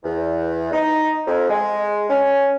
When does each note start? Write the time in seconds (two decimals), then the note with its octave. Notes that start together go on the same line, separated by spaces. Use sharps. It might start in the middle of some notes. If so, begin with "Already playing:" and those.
0.04 E2
0.73 D#4
1.27 F2
1.49 G#3
2.10 C#4